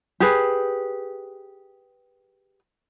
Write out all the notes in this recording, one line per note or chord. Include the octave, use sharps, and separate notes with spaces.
G4 G#4 B4